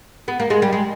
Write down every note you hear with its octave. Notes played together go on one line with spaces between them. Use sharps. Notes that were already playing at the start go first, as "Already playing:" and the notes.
B3
A#3
G#3
G3
G#3